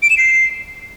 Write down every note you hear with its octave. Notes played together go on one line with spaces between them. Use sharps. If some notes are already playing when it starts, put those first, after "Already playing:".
D7
E7
C7